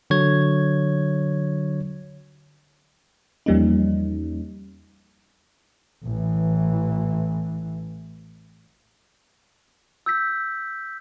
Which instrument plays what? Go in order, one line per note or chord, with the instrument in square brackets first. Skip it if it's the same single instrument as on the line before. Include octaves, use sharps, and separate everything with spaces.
[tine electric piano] D3 F#3 C#5 G#6
[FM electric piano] E2 F3 G3 A#3 C#4 D#4
[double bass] A1 E3
[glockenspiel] E6 G6 B6